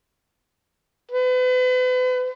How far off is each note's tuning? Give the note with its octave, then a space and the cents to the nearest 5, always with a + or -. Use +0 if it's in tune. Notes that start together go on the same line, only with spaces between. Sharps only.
B4 +40